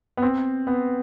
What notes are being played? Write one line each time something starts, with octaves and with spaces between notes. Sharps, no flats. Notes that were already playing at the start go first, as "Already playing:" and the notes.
B3
C4
B3